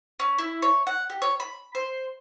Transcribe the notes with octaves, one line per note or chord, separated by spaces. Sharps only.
C#4
E4
C#5
F#5
G4
C#5
B5
C5